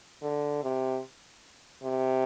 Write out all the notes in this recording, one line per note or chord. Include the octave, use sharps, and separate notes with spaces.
D3
C3
C3